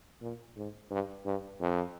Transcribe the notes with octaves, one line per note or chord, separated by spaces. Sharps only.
A#2
G#2
G2
G2
F2